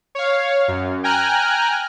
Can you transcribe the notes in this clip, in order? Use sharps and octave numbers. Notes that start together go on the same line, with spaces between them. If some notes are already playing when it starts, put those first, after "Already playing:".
C#5 F5
F#2
G5 G#5 A#5 F6 F#6